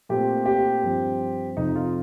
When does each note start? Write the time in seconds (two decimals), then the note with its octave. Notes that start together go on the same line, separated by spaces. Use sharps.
0.09 A#2 A3 C4 G4
0.46 G4
0.83 G2 F3 C4
1.57 F2 C3 F3 D#4
1.76 F4